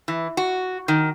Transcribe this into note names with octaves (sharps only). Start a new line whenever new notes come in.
E3
F#4
D#3